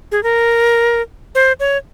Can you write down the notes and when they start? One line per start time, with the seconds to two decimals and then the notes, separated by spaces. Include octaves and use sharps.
0.12 G#4
0.23 A#4
1.35 C5
1.60 C#5